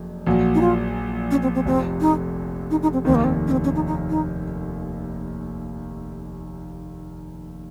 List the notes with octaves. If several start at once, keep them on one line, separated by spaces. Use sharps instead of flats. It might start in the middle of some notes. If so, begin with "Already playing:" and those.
Already playing: F#1 F2
A#1 A#2 F#3
D#4
F4
C#4
C4
C4
F1 F2 C3 C4
D#4
D#4
D#4
C4
F1 D#2 D#3 C4
A#3
C4
C#4
C4
C#4
D#4
D#4
D#4